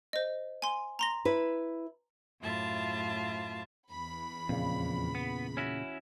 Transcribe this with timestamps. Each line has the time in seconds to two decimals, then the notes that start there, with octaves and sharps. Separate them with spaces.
0.13 C5 D#5
0.62 G#5 C6
0.99 A#5 C6 A#6
1.25 E4 B4
2.41 F#2 A2 F4 E5 A5
3.90 E2 B5
4.49 F2 A#2 C#3
5.15 B3
5.57 C#4 E4 F#4